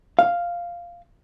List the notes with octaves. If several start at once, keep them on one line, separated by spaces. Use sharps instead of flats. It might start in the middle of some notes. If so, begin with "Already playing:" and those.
F5